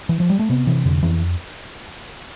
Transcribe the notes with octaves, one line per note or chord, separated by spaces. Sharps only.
E3
F3
G3
A3
C3 B3
C3 E3
F2 D3
F2 E3